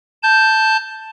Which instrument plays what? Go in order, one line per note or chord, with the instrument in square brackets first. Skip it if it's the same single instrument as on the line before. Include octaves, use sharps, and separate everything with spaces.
[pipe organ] A5 G6